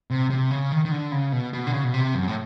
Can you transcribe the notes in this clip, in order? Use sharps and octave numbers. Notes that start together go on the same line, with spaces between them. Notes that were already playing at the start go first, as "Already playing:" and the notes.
C3
C3
C#3
D#3
D#3
D3
C#3
B2
B2
D3
C#3
B2
C3
F#2
A2